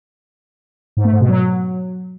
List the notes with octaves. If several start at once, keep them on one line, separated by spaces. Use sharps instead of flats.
G#2
A3
G#2
B2
F#3